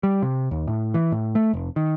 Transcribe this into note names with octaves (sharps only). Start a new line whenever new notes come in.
G3
C3
D#2
A2
E3
A2
A3
F1
D#3